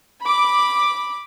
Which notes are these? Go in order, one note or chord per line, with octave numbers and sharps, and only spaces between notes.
B5 D6